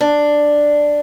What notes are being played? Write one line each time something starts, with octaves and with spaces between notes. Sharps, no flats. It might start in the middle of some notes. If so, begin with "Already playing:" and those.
D4